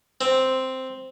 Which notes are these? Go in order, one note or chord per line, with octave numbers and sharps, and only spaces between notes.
C4